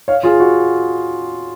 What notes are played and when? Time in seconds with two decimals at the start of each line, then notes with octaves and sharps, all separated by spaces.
0.08 C#5 F5
0.23 F4 G#4
0.40 F#4